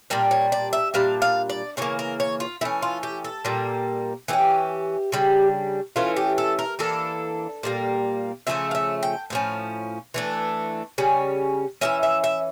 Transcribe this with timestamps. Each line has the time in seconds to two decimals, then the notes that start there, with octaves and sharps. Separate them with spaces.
0.10 A#2 G3 D4 A#4
0.31 C#5
0.52 D5
0.73 E5
0.94 A#2 G3 D4 F5
1.22 F5
1.50 D5
1.77 C#3 E3 A#3 C#5
1.99 A#4
2.20 C#5
2.40 F4
2.61 E3 A3 C#4 E4
2.82 F4
3.03 G4
3.24 A4
3.45 A#2 G3 A#3
4.28 E3 A3 G4
4.33 C#4
5.12 C#3 G3 D4
5.96 E3 A3 C#4 F4
6.16 G4
6.38 A4
6.59 A#4
6.79 E3 A#3 D4 A4
7.63 A#2 G3 A#3
8.47 C#3 F3 A3 C#4 E5
8.71 F5
8.75 E5
9.03 G5
9.30 A2 F3 C#4
10.14 E3 A3 D4
10.98 C#3 G3 C#4
11.81 E3 A#3 C#4 E5
12.03 E5
12.24 E5